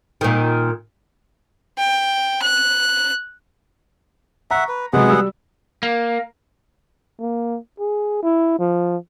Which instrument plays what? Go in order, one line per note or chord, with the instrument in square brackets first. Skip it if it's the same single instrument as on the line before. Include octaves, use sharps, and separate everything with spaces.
[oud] A#2 D#3
[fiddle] G5
F#6
[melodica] E5 F#5 [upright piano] A#5 C#6
[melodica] B4
[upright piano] C3 F#3 G#3 [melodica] B3 G#4 F#5
[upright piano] G3 E6
[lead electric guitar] A#3
[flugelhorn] A#3
G#4
E4
F3